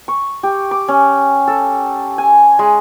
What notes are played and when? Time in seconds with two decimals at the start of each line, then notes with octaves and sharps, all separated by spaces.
0.08 C#6
0.43 G4
0.71 D6
0.88 C#4
1.48 A4
2.18 G#5
2.59 G#3